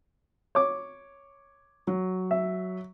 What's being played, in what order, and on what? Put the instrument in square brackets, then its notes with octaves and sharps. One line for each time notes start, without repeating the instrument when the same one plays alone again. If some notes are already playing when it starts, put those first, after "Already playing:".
[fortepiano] C#5 D6
[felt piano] F#3
[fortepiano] E5